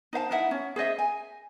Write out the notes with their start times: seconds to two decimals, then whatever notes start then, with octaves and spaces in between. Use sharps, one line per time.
0.13 D#4 C5 F5 A5
0.31 D#4 E4 E5 F#5
0.51 C#4
0.76 G#4 C5 D#5 E5
0.98 G#5